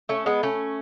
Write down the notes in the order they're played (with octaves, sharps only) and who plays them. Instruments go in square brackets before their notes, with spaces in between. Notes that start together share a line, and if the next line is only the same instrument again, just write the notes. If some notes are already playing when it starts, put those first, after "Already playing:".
[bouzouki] A3 C#4
G#3 B3
A3 C#4